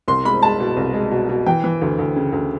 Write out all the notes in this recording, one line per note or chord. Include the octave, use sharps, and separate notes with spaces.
C2 C6
G#3 B5
G#3 A5
B2
C2
G#3
B2
B2
E3 G5
E3
D2
D2
C#3
D2